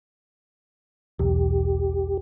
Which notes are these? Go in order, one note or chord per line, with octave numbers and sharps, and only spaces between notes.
B1 E2 G4